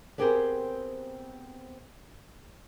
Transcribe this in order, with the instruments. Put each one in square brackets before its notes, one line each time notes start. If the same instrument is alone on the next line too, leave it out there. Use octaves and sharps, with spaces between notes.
[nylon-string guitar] B3 C4 G4 G#4 A#4 C5